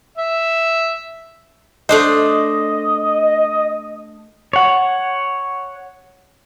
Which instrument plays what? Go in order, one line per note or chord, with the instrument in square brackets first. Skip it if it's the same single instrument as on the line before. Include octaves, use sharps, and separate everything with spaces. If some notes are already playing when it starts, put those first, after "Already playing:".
[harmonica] E5
[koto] A3 D4 C5 [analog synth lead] D#5
[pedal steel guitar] C#5 F#5